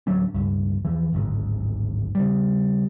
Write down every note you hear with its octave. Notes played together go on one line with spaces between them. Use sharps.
D1 F#3 C#4 D4
C#2 G2
E2 E3 F3
D1 G#1 D2 G#2
C#3 G3